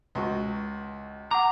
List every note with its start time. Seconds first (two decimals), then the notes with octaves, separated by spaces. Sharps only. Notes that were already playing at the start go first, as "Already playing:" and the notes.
0.15 C#2 F#4
1.31 F#5 A#5 D6